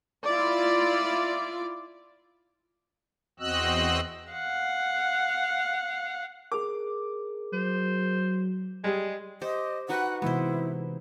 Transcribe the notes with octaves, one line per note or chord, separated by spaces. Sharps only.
E4 F4 D5
E2 C4 F#4 D#5 E6 F#6
F5 F#5
G#4 A#4 D6
F#3 C5
G3 G#3 G#4
G4 C5 D#5
D#4 F#4 B4 F#5
C3 E3 G#3 B3 E4 C5